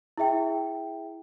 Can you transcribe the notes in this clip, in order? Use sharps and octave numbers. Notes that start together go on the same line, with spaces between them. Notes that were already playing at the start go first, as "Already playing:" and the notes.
E4 G#4 E5 G5